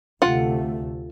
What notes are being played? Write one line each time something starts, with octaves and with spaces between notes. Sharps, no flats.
D2 C3 A3 F4 F#5